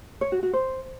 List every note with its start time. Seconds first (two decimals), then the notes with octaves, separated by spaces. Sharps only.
0.21 C#5
0.32 F#4
0.43 F#4
0.53 C5